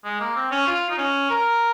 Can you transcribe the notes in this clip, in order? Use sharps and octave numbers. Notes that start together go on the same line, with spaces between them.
G#3
A#3
C4
C#4
F4
D#4
C#4
A#4